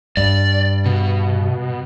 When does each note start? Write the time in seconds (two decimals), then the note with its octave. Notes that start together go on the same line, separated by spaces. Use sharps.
0.17 G2 D5
0.86 B2